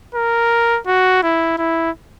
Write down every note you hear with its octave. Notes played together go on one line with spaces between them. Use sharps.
A#4
F#4
E4
E4